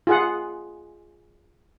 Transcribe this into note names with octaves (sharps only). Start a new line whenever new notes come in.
F4 G#4 F#5